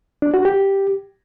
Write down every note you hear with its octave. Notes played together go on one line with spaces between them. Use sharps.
D4
F#4
G4